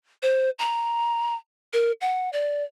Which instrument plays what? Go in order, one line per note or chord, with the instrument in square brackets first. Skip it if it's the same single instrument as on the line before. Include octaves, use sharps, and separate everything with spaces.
[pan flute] C5
A#5
A#4
F#5
D5